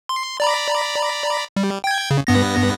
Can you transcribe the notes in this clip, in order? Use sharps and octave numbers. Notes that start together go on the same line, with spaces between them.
C6
D5 A#5 B5
G3
G5 G#6
C#3
G2 B3 A#6